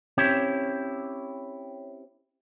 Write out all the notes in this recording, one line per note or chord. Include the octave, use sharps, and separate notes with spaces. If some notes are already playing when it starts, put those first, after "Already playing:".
C4 C#4 E4 G4 C#5